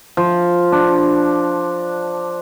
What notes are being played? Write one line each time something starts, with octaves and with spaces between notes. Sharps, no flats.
F3
D4